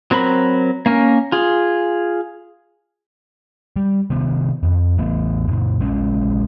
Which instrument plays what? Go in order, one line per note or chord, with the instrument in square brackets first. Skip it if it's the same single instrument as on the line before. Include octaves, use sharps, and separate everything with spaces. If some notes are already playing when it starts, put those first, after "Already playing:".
[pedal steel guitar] F#3 C4 A#4 B5
A#3 C#4 A#4
F4 G#4
[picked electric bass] G3
C3 D#3 B3
F2
A1 E3 A3 B3
F#2 A#2
A#1 G#3 C#4